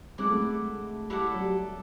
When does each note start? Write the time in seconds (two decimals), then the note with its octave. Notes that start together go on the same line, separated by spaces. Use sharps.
0.18 G#3 E4 A4 D5 F#5
0.26 A3
0.32 G#3
1.10 G3 E4 A4 D5 F#5
1.33 F#3
1.41 G3